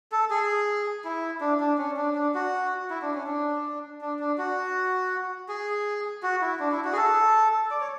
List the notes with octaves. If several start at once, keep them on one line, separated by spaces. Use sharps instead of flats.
A4
G#4
E4
D4
D4
C#4
D4
D4
F#4
E4
D4
C#4
D4
D4
D4
F#4
G#4
F#4
E4
D4
E4
F#4
G#4
A4
D5
C#5